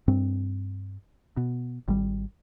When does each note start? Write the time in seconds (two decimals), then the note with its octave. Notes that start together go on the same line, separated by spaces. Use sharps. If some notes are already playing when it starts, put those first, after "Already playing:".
0.08 G2 C4
1.37 B2
1.88 G#1 G3